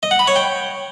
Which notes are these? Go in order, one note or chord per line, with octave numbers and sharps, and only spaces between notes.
D#5
F#5
B5
C#5
G5